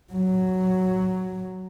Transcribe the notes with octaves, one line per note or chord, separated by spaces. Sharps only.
F#3